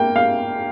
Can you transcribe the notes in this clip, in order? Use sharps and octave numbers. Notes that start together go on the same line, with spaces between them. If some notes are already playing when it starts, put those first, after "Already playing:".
Already playing: A#3 G5
F5